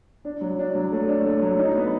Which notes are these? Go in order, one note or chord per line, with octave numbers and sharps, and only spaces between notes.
D4
F#3
D4
F#3
A3
D4
A3
F#3
D#4
B3